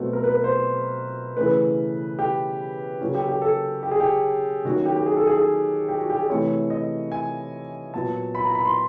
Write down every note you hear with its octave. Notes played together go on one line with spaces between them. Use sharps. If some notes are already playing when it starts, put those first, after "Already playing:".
Already playing: B2 F#3 A3 C4 B4
A#4
B4
B4
C5
C#3 E3 A3 C#4 B4
G4
C#3 F#3 A#3 C#4
G4
G4
A4
G4
G#4
G4
D#3 F#3 A#3 C#4 F#4
F#4
G4
G4
G#4
A4
G#4
G#4
G4
F#4
G4
G#4
C3 E3 A3 C#5
D#5
G#5
A#2 F#3 B3 A5
B5
A#5
B5
C6